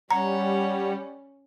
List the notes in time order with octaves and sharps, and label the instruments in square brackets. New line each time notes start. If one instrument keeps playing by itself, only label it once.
[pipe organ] G3 [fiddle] C#4 [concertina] C#5 F#5 [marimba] A#5